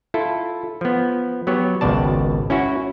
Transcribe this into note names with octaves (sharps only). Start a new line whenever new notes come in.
E4 F4 A4
F3 B3
F#3 B3 G4 C#5
G#1 C#2 B2 D5 A5
C#4 E4 F#4